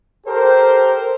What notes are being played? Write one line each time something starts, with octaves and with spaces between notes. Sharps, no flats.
G4 A4 A#4 C5